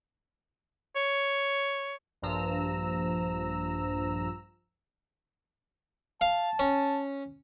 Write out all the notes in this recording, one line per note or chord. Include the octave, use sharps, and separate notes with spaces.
C#5
A#1 G2 F3 A#5 E6
F5 A5
C#4